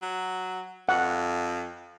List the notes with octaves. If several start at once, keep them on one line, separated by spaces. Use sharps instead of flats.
F#3
F2 F#5